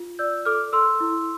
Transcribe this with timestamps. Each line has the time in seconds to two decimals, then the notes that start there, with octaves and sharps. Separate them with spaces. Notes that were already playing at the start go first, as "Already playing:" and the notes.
Already playing: F4
0.19 D5 E6 G6
0.45 A4 D6 F6
0.73 A4 C6 E6
1.00 E4